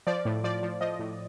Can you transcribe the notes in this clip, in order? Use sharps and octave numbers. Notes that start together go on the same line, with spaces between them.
F3 D5
A2
F3 D5
F3
F3 D#5
A2